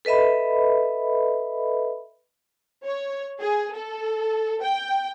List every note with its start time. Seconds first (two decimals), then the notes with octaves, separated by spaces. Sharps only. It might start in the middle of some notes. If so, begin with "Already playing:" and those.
0.05 A4 B4 D#5 E5 B5
2.83 C#5
3.40 G#4
3.74 A4
4.62 G5